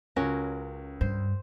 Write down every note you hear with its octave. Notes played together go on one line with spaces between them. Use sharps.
C#2 C#4 F#4 A#4
G2 C5